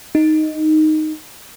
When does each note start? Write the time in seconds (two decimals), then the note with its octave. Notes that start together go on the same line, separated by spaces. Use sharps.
0.15 D#4